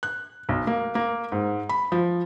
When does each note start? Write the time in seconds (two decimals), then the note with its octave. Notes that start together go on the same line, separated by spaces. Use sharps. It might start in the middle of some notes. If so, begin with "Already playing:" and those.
0.03 F#6
0.49 B1
0.67 A#3
0.95 A#3
1.32 G#2
1.69 B5
1.92 F3